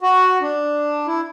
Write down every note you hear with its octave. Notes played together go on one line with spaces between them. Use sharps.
F#4
D4
E4